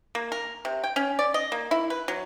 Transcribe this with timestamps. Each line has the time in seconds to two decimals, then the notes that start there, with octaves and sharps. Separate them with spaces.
0.15 A#3
0.32 A#4
0.65 C3
0.84 G5
0.96 C#4
1.19 D5
1.34 D#5
1.52 A#3
1.71 E4
1.90 B4
2.08 F#3